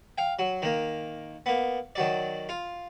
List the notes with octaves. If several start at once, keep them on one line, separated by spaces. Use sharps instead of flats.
F5 G5
F#3
D#3 A#3
A#3 B3
D#3 F#3 D5
F4